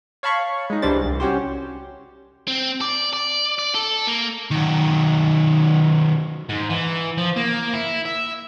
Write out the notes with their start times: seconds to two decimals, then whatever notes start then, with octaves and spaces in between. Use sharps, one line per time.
0.23 C#5 F5 A5 B5 C#6
0.70 G#3 D#4
0.82 C2 E3 G3 D4 C5 A6
1.05 C2
1.20 C#4 F#4 G4 C5
2.48 C4
2.81 D5
3.13 D5
3.59 D5
3.75 A4
4.07 A#3
4.51 D#3 F#3
6.49 G#2
6.70 E3
7.18 F3
7.36 A#3
7.73 E4
8.05 E5